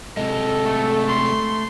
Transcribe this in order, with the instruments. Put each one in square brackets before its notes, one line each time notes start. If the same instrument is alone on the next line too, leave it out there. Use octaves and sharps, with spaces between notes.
[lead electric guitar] C3 G#3 [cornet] A4 [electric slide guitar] D#5
[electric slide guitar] A3
[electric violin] C6